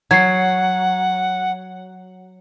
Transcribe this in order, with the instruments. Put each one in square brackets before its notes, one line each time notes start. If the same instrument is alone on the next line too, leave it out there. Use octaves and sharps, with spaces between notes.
[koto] F#3 [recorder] F#5 [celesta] G#6 C7